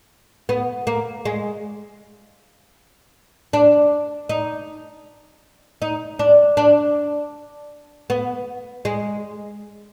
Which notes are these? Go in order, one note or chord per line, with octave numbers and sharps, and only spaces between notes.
B3
A#3
G#3
D4
D#4
D#4
D4
D4
B3
G#3